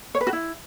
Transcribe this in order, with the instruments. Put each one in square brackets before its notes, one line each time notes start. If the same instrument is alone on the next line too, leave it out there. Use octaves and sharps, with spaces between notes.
[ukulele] C#5
B4
F#4
E4